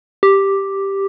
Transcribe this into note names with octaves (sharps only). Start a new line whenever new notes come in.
G4